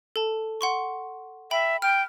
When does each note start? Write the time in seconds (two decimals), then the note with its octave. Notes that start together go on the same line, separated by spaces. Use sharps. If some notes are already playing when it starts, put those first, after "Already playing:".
0.16 A4 A5
0.61 F#5 C6 C#6
1.51 E5 G5 B5
1.82 G5 F6